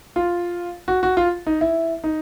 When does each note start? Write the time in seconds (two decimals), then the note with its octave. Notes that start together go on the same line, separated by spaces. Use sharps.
0.16 F4
0.88 F#4
1.03 F#4
1.17 F4
1.47 D#4
1.61 E4
2.04 D#4